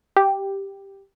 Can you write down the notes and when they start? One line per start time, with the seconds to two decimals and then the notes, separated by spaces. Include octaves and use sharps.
0.17 G4